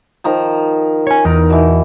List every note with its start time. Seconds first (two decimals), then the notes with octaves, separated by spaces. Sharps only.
0.24 D#3 F3 A#5
1.07 C#5 G#5
1.25 E2 D#4 A#4
1.50 B2 E3